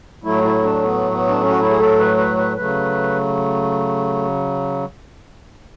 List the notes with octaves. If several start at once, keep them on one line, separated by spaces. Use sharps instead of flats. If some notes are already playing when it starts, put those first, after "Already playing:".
A2 F#3 A3 E4
E4
D4
B3
B3
D4
C#4
F#4
E4
G#4
A4
B4
B4
B4
C#3 F#3 A3 B4